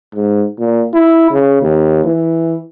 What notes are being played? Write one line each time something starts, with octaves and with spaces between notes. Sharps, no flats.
G#2
A#2
E4
C#3
D#2
E3